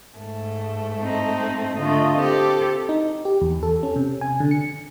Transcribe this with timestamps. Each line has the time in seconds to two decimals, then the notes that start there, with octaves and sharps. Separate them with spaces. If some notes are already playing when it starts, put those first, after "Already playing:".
0.16 G#2 A3
1.02 C4 D#4
1.77 D3 A3 F4 D#5
2.17 C4 G4 A4
2.89 D#4
3.25 G4
3.41 E2
3.63 A4
3.83 C#4
3.96 C3
4.21 G#5
4.40 D3
4.51 C#7